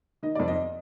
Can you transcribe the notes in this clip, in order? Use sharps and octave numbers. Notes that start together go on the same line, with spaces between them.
D#3 D#5
F2 D5
D#5